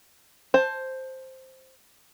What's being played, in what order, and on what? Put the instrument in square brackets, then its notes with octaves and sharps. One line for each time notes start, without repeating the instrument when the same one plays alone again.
[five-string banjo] C5 A5